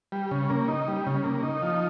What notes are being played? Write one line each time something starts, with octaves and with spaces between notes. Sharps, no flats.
G3
C#3
A#3
D#4
G3
C#3
A#3
D#4
F3